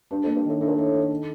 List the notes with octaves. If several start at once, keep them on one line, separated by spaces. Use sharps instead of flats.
G2 D4
F2
A#3
G2
A2 D#3
A2 D4
A#2
A2 D#3
D#3
A4